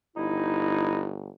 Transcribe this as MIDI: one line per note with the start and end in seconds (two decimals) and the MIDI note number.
0.17 1.29 31
0.17 1.12 63
0.17 1.12 64